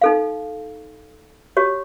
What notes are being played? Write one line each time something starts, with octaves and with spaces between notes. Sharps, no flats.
D#4 A4 F5
F#4 G4 C#5